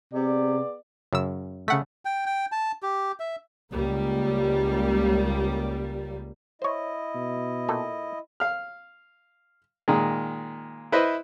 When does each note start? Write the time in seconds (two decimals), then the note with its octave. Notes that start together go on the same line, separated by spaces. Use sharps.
0.14 C3 B3 G#4 D5
1.13 F#2 C#3 E6
1.68 C#3 A3 F#5 B6
2.05 G5
2.26 G5
2.52 A5
2.83 G4
3.20 E5
3.72 C#2 G3 A#3
6.62 E4 C5 C#5 D#5
7.15 B2
7.69 A#2 A4 G5
8.40 F5 F6
9.88 A#2 D#3 G#3
10.92 E4 B4 C5 D#5 E5